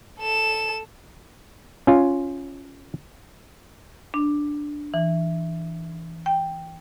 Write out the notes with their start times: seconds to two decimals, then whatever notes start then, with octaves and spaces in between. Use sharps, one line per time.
0.19 A4 E7
1.87 C#4 F4
4.14 D4
4.94 E3
6.26 G5